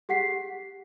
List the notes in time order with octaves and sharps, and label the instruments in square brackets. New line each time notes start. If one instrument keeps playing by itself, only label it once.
[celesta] G4 G#4 F#5 B6 C7